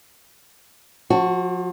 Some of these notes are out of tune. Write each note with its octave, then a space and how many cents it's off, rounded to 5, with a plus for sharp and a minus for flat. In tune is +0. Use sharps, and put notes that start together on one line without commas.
F3 +35 F#4 +0